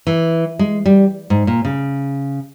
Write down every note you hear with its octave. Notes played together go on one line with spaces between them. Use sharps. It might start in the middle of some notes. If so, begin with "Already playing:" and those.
E3
G#3
G3
G#2
A#2
C#3